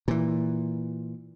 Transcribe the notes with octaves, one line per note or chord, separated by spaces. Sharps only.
A#2 E3